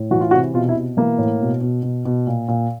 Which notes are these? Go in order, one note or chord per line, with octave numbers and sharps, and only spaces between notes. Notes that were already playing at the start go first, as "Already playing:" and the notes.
Already playing: A2
E3 F#4
F4
C3 F#4
B2 F4
E4
B2
E3 A#3
A2
B2
B2
B2
B2
A#2
A#2